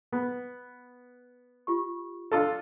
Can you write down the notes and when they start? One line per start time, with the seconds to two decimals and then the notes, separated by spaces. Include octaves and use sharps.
0.12 B3
1.67 F4 G4 C#6
2.32 D4 F4 A4